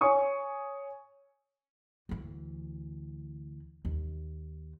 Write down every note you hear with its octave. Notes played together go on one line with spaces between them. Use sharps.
C#5 G#5 C#6 D#6
D2 E3
D#2